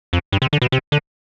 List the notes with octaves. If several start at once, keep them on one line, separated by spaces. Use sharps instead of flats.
F2
G2
C3
D3
B2
C3
D3